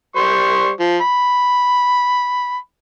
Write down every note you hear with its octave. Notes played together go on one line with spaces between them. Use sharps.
G3 C5 C#6
F3
B5